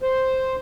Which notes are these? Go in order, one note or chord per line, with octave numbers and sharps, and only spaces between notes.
C5